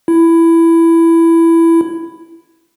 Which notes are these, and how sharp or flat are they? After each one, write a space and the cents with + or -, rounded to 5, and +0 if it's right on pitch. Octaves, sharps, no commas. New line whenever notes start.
E4 +10